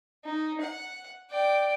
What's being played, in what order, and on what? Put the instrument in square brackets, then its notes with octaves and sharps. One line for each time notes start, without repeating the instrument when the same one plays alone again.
[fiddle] D#4
F#5
D5 G5